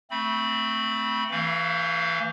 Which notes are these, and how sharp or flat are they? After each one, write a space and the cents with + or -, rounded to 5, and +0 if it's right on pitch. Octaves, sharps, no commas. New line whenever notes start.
A3 +15 C4 +0 B5 -20
E3 +10 A3 +45 F5 +0